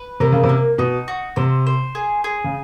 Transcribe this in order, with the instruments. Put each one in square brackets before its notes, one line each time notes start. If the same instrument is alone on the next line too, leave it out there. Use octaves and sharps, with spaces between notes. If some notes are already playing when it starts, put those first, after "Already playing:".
Already playing: [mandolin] B4
[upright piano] C3 [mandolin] A#4
[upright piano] C#3
C3
[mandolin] A#3
[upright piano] B2 [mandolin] D#4
[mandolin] F#4
[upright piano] C3 [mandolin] C5
[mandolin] C5
G#4
G#4
[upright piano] C#3